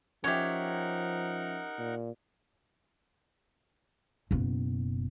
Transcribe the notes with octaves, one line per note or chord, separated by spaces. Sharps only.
F3 C#4 D#4 G4 A#4 C#5 E5 F#5
A#2
F#1 B2